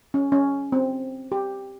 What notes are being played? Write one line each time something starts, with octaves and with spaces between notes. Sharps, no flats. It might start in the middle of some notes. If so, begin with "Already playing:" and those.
C#4
C#4
C4
G4